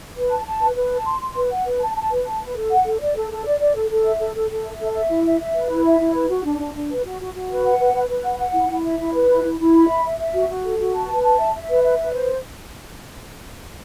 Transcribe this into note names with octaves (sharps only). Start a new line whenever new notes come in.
B4
A5
A5
B4
B4
A5
C6
C6
B4
F#5
B4
A5
A5
B4
A5
B4
A4
F#5
A4
D5
A4
A4
D5
D5
A4
A4
E5
A4
A4
A4
E5
A4
E5
E4
E5
E5
B4
E4
E5
E4
B4
F#4
D4
D4
D4
B4
F#4
F#4
F#4
B4
F#5
B4
B4
B4
F#5
F#5
E4
E4
E5
E4
B4
E4
E4
E4
B5
E5
E5
E5
F#4
F#4
A4
F#4
A5
B4
A5
E5
E5
B4
E5
B4
C5